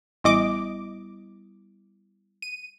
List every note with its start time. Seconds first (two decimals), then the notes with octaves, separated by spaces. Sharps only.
0.24 A1 G3 B3 E4 D#5 D6
2.42 D#7